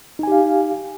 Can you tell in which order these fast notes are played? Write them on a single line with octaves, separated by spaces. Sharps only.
D#4 G#5 G4 F5